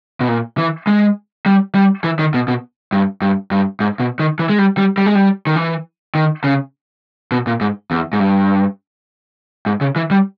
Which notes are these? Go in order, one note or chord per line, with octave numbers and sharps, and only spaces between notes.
B2
A#2
E3
G#3
G3
G3
E3
D#3
B2
B2
G2
G2
G2
G#2
B2
D#3
E3
G#3
G3
G3
G3
G#3
G3
D#3
E3
D#3
C#3
B2
A#2
G#2
E2
G#2
G2
G#2
C#3
E3
G3